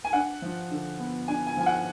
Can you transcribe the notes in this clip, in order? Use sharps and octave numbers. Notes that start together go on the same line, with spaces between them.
G#5
D4 F#5
F3
D3
B3
D4 G#5
G#5
F3 G#5
F#5